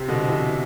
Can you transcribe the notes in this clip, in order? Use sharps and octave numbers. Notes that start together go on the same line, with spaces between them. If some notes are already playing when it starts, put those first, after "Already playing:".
Already playing: C3
B2 D3
C3 E3